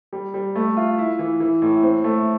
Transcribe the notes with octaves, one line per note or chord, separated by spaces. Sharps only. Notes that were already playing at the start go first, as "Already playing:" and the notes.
G3
G3
A3
F4
E4
E3
E3
A2
C4
A3